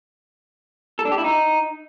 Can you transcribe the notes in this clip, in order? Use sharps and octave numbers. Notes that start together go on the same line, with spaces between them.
A4
D4
G4
E4
D#4